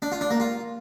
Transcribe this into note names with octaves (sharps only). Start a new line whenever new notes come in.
D4
F4
D4
A#3
F4